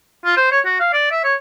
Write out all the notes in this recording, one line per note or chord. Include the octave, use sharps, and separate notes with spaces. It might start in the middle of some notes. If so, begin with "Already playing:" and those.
F4
C5
C#5
F#4
F5
D5
E5
C#5